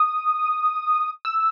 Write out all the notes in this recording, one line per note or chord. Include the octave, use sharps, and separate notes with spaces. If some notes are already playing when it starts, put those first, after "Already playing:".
Already playing: D#6
E6